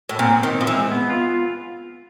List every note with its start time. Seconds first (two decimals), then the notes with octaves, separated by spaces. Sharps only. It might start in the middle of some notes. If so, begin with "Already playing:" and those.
0.09 A2
0.19 A#2 C4
0.37 C4
0.43 D#3
0.55 C4
0.61 F3
0.67 E3
0.73 G#3
0.92 B3
1.10 F4